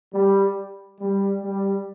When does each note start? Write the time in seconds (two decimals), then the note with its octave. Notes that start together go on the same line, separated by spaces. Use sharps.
0.14 G3
1.00 G3
1.43 G3